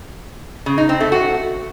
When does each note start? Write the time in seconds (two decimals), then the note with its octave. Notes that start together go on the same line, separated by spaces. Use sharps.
0.66 C#3
0.78 D#4
0.89 C4
1.00 A3
1.12 F#4